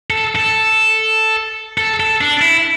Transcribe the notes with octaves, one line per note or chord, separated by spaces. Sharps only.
A4
A4
A4
A4
D4
E4